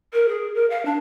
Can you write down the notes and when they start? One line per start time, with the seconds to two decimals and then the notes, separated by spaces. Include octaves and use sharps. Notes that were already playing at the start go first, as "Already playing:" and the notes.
0.13 A#4
0.28 G#4
0.54 A#4
0.70 F5
0.85 D4